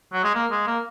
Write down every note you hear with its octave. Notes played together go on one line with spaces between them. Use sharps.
F#3
G#3
A#3
G#3
A#3